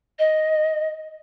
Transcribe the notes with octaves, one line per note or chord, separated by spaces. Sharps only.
D#5